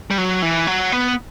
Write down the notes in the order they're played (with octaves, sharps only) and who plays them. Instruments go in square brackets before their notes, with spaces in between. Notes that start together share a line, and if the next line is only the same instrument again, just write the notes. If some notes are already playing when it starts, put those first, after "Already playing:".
[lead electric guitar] G3
F#3
E3
F#3
B3